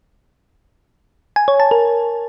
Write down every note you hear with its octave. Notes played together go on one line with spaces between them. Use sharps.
G#5
C#5
A5
A#4